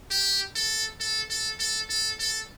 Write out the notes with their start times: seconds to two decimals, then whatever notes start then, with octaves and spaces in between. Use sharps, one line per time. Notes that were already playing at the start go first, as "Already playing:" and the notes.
0.11 G4
0.56 A4
1.00 A4
1.30 A4
1.60 A4
1.90 A4
2.20 A4